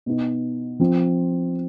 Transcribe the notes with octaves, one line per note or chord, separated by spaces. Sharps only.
B2 B3 D#4
F3 C4 F4